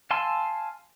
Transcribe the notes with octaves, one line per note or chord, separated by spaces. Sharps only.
F5 G#5 A5 C6 E6